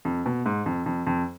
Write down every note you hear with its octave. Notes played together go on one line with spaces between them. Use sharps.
F2
B2
G#2
F2
F2
F2